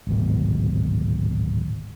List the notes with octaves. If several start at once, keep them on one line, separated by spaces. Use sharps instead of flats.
D1 G#1 B2